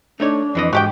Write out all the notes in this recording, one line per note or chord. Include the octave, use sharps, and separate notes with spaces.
A3 D4 D#4 C#5
F2 E3 D#5
G#2 F#4 G4 G5